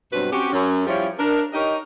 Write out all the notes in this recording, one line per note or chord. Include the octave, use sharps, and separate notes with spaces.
G2 B2 F#3 C4 F#4 B4
C4 C#4 F#4 G4
F#2 C#4
F3 G3 C#4 E4 F4 G4
D4 A#4
D#4 G4 A#4 C#5 D#5